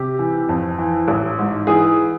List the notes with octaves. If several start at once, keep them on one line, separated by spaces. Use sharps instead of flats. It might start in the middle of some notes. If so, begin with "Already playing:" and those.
Already playing: C3 G4
E3
F2
E3
A1
G#2
E3 G#4